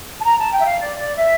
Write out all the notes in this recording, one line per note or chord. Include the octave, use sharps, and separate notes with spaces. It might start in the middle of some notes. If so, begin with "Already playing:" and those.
A5
A#5
A5
G5
E5
F5
D5
D5
E5